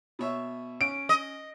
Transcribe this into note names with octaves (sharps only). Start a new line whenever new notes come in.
B2 C#5 E5
C#4 D7
D#5